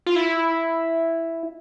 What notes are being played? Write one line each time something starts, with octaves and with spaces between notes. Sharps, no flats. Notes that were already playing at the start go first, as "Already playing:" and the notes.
F4
E4